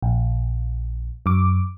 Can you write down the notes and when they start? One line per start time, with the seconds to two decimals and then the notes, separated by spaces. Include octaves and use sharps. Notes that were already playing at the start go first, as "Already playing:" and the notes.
0.03 A#1
1.26 F#2 D6